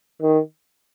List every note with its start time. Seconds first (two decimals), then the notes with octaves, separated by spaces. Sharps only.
0.21 D#3